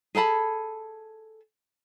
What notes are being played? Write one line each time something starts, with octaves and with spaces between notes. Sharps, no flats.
G#4 A4 A5 B5